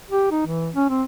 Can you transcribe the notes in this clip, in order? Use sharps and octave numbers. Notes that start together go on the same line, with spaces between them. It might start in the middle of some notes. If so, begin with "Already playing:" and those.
G4
D#4
E3
C#4
C4